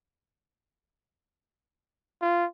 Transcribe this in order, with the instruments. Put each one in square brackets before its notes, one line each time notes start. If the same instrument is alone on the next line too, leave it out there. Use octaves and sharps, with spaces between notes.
[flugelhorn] F4